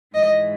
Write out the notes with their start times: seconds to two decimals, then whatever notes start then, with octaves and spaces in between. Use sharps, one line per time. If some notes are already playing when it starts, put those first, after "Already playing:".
0.15 G#2 E3 D#5